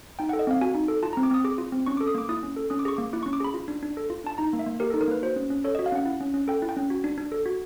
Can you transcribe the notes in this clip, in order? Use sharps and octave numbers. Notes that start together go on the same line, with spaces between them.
D#4 G5
A4 F#5
D#5
C4 F5
F#4 G#5
D#4
A4
F4 A5
C4 A#5
D6
C4 D#6
G#4 D6
F4
C4
C#4 C#6
A4 D6
D#6
A#3 D6
E4 D#6
C#4
A4
C#4 D#6
D6
G#4 C#6
A#3 D6
E4 D6
C#4 C#6
D6
G#4 B5
F4
D4
D4
A4
F4
D4 A5
D#4 A#5
A#3
E5
A#3
G4 A#4
D#4 A4
A#4
A#3 B4
F#4 C5
C#4
C#4
A4 C#5
F#4 D#5
F5
C#4 F#5
E4
C#4
C#4
A4 G5
E4
G5
C#4
F#4
D4
D4
A4
F#4